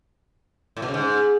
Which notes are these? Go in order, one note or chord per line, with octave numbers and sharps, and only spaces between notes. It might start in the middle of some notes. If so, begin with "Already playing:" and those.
A2
B2
C#3
G#2